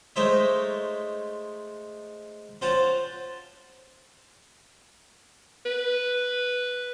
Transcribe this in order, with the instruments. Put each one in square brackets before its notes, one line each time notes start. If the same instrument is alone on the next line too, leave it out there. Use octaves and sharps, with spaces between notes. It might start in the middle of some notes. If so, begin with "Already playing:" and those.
[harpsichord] G#3 A3 D#4 C5 C#5 E5
C#4 F4 C5 F#5 A5
[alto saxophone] B4